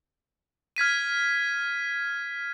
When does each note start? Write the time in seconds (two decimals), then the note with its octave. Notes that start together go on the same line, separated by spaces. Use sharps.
0.76 F6 G#6 B6 D#7